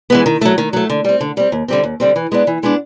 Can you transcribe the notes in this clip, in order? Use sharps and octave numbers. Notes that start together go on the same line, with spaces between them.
E3 G#3 B3
D#3
F#3 A3
D#3
F#3 A3
D3
G3 C4
D3
G3 C4
D#2
D3 G3 C4
D#2
D3 G3 C4
E3
G#3 B3 D4
E3
G#3 B3 D4